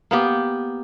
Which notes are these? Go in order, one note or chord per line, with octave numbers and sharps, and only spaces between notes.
A#3 B3 G4